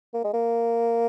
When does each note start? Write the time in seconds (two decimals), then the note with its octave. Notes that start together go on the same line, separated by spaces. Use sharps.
0.14 A#3
0.24 G#3
0.34 A#3